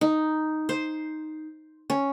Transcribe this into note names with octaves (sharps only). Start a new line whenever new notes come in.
D#4
C5
C#4